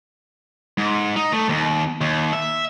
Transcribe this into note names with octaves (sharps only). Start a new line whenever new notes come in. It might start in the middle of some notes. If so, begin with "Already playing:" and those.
G#2
D#4
A3
D#2
D#2
E5